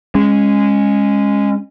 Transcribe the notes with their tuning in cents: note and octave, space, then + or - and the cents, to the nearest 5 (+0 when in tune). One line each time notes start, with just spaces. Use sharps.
G#3 -15 C#4 -10